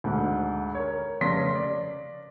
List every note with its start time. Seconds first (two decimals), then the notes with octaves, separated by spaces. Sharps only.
0.04 D2 G#2
0.75 A#4 C#5
1.21 F1 C#3 C6 A#6 B6
1.55 D5